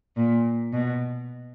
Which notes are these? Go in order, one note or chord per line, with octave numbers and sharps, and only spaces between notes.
A#2
B2